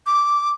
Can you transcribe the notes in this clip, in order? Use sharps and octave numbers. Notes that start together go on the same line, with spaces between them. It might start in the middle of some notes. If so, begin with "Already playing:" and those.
D6